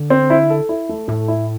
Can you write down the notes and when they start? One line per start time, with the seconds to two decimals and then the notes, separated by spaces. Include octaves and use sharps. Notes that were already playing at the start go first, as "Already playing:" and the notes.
Already playing: D3
0.10 C4
0.30 E4
0.50 A4
0.69 E4
0.89 A3
1.08 A2 A3
1.28 E4